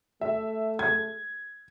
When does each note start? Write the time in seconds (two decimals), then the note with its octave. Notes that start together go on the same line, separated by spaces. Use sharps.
0.21 A3 E5
0.79 G#6